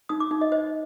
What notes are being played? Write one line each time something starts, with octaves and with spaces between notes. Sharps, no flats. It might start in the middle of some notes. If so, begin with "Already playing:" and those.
D#4 D#6
D6
D#4
D#5
C5 D#5